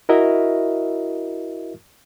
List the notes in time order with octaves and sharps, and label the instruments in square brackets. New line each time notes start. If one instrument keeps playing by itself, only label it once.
[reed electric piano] E4 F#4 A#4 D#5 E5